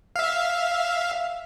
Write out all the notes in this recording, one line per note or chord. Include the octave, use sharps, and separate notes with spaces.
E5 F5